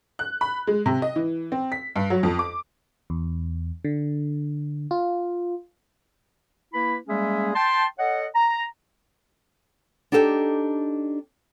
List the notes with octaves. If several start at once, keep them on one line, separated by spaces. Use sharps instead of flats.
F#6
B5
G#3
C3
D#5
E3
C4
B6
G2
F#3
F2
D6
E2
D3
F4
A#3 E4 B4 B5
G3 G#3 A#3 C#4 G#4 E5
G5 A5 C6
A4 C#5 D#5 F#5
A#5
D4 D#4 G4 A4 G5